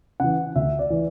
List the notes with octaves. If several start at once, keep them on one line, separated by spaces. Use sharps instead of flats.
C#3 E3 F#5
D2 E5
D5
E3